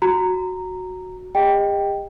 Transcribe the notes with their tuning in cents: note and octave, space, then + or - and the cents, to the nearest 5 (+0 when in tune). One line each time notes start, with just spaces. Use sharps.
F#4 -5 A#5 -10
G4 +45 D#5 +0 G5 +0